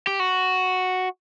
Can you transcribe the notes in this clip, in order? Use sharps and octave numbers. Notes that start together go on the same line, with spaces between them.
G4
F#4